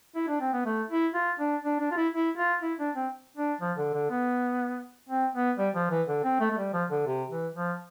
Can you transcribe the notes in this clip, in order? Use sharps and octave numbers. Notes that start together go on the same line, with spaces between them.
E4
D4
C4
B3
A3
E4
F4
D4
D4
D4
F4
E4
E4
F4
E4
D4
C4
D4
F3
D3
D3
B3
C4
B3
G3
F3
E3
D3
C4
A3
A3
G3
F3
D3
C3
E3
F3